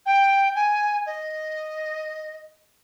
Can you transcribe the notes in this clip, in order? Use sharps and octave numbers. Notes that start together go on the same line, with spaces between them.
G5
G#5
D#5